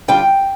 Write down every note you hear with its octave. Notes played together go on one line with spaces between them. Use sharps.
D3 G3 D4 F4 G5